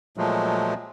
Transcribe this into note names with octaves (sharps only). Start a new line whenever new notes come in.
A#2 F3 F#3 G#3 A3